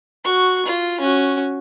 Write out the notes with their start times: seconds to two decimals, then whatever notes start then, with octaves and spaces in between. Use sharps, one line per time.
0.25 F#4 C#6
0.66 F4
1.01 C#4 F#4